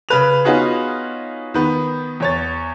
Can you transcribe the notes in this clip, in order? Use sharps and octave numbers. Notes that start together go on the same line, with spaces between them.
C#3 B4 F7
B3 C#4 D#4 F4 F#4 G#4
D#3 B3
E2 C#5 A6